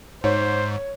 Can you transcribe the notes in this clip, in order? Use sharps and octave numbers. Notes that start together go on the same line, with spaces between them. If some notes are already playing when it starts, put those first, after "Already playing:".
G#2 C5 C#5